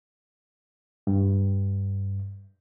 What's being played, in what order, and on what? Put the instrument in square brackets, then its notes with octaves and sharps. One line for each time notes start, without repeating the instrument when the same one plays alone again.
[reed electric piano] G2